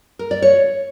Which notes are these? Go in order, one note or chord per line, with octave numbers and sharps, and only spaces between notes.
A#4
D5
C#5